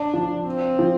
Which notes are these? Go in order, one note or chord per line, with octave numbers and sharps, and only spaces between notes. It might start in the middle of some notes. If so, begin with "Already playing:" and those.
Already playing: D4
F3
C4
F3